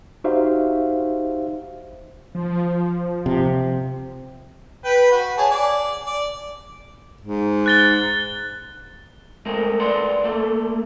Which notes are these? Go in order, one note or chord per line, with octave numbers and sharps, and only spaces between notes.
D#4 F#4 G4 C5 E5 F5
F3
C3
B4 G5
F#4
G#4 C#5 A5
D5
D5
G#2
F#6 A6 G7
G#3 A3 C4 A#4
B4 D5 F#5 C6
A3 A#3 A4